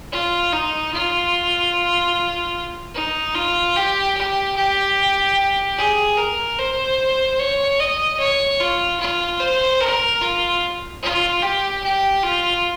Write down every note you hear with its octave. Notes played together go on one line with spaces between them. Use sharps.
F4
D#4
F4
D#4
F4
G4
G4
G4
G#4
A#4
C5
C#5
D#5
C#5
F4
F4
C5
A#4
F4
F4
G4
G4
F4